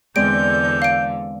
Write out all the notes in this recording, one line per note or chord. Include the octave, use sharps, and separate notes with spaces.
E2 D3 G#3 C4 A4 D5 G6 D7
F5 D7